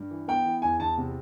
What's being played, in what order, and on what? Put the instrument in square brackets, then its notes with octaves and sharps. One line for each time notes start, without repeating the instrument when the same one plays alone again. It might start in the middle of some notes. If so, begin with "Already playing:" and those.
Already playing: [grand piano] G2
E3
B3 G5
E3
E2 G#5
E2 A5
C3